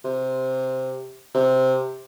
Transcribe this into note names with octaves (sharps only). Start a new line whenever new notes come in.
C3
C3